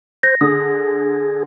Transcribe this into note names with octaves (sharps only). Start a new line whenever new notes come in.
C5 A#6
D3 G#4